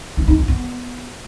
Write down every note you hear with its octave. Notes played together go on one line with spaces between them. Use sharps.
F4
D#4
F4
B3